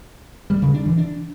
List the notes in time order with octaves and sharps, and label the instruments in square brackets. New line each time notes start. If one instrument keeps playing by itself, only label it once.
[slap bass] G3
C#3
D4
E3
D4